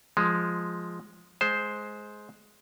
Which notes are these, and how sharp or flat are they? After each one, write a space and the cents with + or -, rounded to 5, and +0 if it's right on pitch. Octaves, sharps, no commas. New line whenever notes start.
F3 +0 G#3 +0
G#3 +15 C5 +0